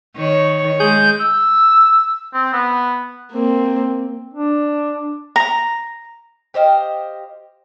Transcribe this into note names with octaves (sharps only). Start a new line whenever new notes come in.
D#3 C#5
G#3 G#4 G6
E6
C4
B3
A#3 C4
D4
A#5
G4 C5 D#5 F5